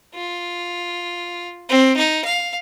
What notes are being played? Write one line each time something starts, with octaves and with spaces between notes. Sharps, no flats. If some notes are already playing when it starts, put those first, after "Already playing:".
F4
C4
D#4
F5